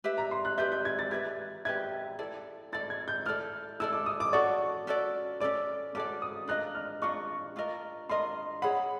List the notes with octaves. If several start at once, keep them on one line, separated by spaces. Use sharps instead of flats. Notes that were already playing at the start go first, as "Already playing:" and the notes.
G4 B4 E5
A#5
C6
F#6
G4 B4 E5 G6
G6
G#6
A6
G4 B4 E5 G#6
G4 B4 E5 G#6
E4 A4 D5
E4 A4 D5 A6
G#6
G6
E4 A4 D5 F6
E4 A4 D5 E6
D6
D#6
D6
C#4 F#4 A4 D5 C#6
C#4 F#4 A4 D5
C#4 F#4 A4 D5 D6
C#4 F#4 A4 D5 D6
D#6
D4 F4 A#4 D#5 F#6
F6
D4 F4 A#4 D#5 C#6
D4 F4 A#4 D#5
D4 F4 A#4 D#5 C6
G#4 C#5 F#5 B5